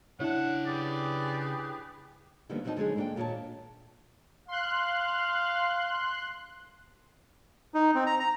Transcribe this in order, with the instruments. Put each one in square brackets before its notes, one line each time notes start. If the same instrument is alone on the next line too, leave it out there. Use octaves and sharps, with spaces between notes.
[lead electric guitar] C#3 A5 [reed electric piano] D4 E4 C#5 [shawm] F#5
[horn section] G4 G#4 B4 [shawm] D5
[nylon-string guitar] D3 D#3 F3 G3 A#3 B3
E2 F3 F#3 C4 D#4 A5
D3 F#3 G#3 D#4 G#4
G#2 A#3 D4 A4 G5
D#2 A#2 G4 C#5 A5
[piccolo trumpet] F5 [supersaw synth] C6 F#6
[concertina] D#4
C4
A#5
A#5